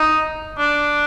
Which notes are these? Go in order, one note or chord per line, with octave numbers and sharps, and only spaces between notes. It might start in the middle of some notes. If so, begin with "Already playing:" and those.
Already playing: D#4
D4